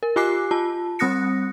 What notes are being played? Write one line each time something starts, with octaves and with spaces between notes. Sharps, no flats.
A#4
F4 G4 G#5 D6 F#6 C7
F4 A5
G3 C4 D#6 F#6 A#6 C#7